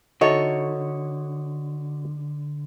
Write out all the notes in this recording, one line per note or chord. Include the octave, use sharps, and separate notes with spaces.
D3 D#4 F#4 A4 C#5 D#5 E5